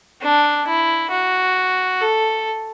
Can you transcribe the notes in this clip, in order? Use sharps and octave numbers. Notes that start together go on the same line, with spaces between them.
D4
E4
F#4
A4